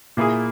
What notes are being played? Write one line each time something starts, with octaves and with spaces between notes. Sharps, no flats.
A#2 A#3 E4 G#4